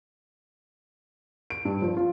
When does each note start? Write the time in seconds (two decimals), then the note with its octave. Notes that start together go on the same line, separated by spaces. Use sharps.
1.50 D7
1.65 G2
1.82 F3
1.97 F4